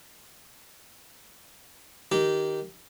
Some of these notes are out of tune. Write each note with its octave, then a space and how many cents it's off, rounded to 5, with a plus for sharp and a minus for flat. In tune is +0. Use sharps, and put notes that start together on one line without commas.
D#3 +0 G4 -15